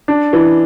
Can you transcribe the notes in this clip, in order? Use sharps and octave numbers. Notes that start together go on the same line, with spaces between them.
D4
E3